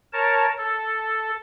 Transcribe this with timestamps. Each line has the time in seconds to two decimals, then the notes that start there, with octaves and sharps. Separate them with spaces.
0.13 A#4 C#5 A5
0.58 A4